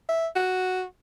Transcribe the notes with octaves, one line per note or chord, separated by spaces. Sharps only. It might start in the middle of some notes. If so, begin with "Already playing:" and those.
E5
F#4